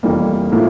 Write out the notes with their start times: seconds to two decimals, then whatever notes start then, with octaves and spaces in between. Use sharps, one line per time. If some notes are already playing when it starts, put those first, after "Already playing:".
0.03 F1 F2 E3 G3 A#3
0.52 A2 F3 A#3 E4